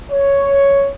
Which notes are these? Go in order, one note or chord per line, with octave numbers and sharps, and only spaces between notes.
C#5